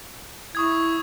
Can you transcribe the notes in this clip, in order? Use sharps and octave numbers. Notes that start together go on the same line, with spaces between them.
E4 C#6 D#6 G#6